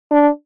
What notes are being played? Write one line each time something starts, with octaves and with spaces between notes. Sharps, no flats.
D4